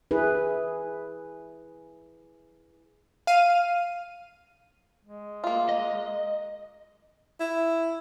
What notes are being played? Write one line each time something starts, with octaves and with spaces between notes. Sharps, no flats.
E4 G#4 B4
F5 D#7
G#3
A#3 F4
D#5
E4